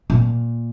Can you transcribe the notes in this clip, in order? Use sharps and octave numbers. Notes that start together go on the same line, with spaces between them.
A#2